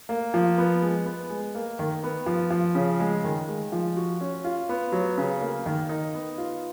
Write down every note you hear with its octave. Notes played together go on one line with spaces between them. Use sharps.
A#3
F3
B3
G#3
B3
G#3
A#3
D#3
B3
F3
F3
C#3
G#3
D#3
G#3
F3
F#4
C#4
F4
B3
F#3
C#3
A#3
D#3
D#4
B3
F4